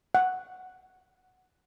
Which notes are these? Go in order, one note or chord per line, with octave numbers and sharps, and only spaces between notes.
F#5